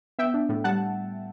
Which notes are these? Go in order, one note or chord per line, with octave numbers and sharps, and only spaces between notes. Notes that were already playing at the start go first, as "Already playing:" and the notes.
B3 E5 G5
D4
A2
G3 F#5 A5